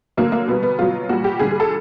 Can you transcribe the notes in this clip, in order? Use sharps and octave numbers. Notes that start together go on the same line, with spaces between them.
D3 F#3 A#3
A#3
B2 G3 B3
B3
B2 F#3 F4
A#2 G3 F#4
G4
D3 G3 G#4
G#4
A4